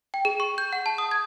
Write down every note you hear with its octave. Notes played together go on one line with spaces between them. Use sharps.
G5
G#4
C#6
G6
F#5
A5
D#6
G#6